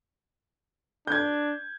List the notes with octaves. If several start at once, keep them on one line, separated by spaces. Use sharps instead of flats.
D4 G6 G#6